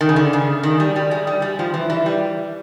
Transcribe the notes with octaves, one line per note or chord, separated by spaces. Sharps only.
D#3
C#3
D3
C#3
D#3
G3
G3
G#3
G3
G3
F3
E3
E3
G3